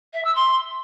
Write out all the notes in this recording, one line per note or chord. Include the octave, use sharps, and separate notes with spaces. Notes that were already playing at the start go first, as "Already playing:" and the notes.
E5
E6
C6